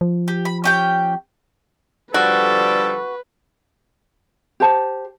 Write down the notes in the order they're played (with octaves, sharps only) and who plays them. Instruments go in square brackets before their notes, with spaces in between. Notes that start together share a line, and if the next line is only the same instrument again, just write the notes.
[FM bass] F3
[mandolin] G4
B5
C#4 G4 G5
[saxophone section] D3 F3 G3 [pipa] F#4 [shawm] A4 [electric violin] B4
[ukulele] G4 C5 A5